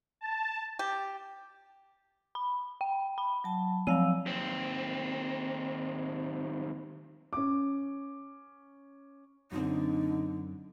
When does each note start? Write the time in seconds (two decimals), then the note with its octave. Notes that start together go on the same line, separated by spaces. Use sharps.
0.21 A5
0.79 G4
2.35 B5
2.81 G5
3.18 B5
3.44 F#3 A5
3.87 F3 F#3 C4 F5 E6 D#7
4.26 D#2 C4
7.33 C#4 D6
9.52 F#2 D3 C4 D#4